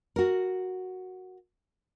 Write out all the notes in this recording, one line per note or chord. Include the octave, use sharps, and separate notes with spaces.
F#4 A#4